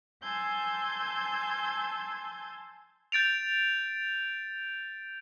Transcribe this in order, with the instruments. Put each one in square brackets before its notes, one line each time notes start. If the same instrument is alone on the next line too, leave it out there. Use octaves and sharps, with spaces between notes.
[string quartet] G#5 A5 C6 E6 G6 G#6
[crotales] G6 A6 D7 F7